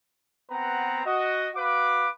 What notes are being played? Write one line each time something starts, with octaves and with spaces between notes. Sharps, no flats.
B3 C4 B4 F#5 A#5
F#4 D#5
F#4 B4 F5 D6